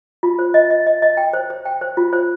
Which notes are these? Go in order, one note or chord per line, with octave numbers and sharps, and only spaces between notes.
F4
C5
D#5
D#5
D#5
D#5
G5
C5
C5
G5
C5
F4
C5